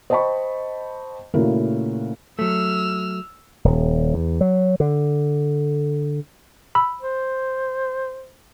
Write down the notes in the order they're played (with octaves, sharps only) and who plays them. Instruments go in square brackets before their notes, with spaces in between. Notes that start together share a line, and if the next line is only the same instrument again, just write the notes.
[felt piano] C5 D#5 G5 A5 B5 C#6
A#2 C#3 A3 E4 F#4 A#4
[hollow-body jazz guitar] F#3 A3 [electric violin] E6 F6
[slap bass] D#1
E2
F#3
D3
[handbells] B5 E6
[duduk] C5